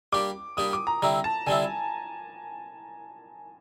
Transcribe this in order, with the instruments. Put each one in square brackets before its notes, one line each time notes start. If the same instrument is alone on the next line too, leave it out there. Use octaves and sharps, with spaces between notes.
[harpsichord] G3 A#3 D4 G4 [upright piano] D6
[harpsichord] G3 A#3 D4 G4 [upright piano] D#6
[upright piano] D6
A#5
[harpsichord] D3 G3 C4 E4 [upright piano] A#5
[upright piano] A5
[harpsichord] D3 G3 C4 E4 [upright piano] G#5